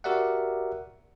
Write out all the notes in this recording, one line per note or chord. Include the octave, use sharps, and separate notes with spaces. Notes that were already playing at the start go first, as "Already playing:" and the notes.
F#4 G4 A#4 D5 E5 F#5